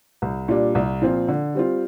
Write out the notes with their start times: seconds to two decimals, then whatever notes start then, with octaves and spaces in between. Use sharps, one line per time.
0.22 C2
0.48 A#2 G3 D4
0.75 C2
1.02 A#2 F3 C4 F4
1.28 D3
1.54 G3 C4 F4